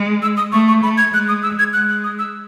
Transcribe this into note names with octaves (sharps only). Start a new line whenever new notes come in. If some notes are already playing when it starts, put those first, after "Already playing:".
Already playing: G#3
E6
D#6
A3 C#6
C#6
A3 B5
G#6
G#3 F#6
D#6
E6
G#6
G#3 F#6
F#6
D#6
E6